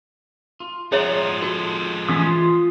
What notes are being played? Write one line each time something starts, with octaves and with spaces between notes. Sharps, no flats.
F4
F3 G#3 G#4 C#5 D5 E5 F#5 A#5
F#4 A4
E3 A3 C#4 D#6
F4 C6 D#6